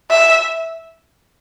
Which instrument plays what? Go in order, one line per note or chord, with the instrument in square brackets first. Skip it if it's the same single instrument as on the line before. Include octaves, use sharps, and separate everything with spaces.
[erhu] E5